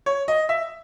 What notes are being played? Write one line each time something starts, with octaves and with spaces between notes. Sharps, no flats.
C#5
D#5
E5